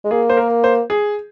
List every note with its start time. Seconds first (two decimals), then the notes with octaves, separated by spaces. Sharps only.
0.04 G#3
0.11 A#3 G#4
0.30 C5
0.37 A#4
0.64 C5
0.90 G#4